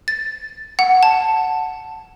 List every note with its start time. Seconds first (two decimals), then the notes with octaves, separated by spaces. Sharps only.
0.08 A6
0.79 F#5
1.03 A5